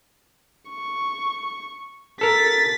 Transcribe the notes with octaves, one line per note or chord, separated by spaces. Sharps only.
C#6
A4 A#4 A6 B6